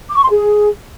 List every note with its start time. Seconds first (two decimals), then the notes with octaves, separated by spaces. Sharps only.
0.10 D6
0.16 C#6
0.23 C6
0.30 G#4